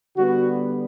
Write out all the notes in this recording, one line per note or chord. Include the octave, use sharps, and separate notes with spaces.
D3 G3 B3 F#4